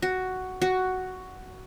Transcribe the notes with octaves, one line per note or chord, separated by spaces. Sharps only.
F#4
F#4